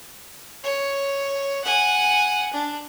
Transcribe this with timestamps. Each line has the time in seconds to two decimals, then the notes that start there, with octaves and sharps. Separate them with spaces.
0.63 C#5
1.64 F#5 G#5
2.53 D4